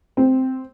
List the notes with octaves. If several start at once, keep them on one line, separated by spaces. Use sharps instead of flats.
C4